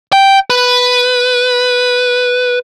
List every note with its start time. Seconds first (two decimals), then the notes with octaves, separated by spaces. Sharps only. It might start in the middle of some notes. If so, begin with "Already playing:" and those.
0.13 G5
0.50 B4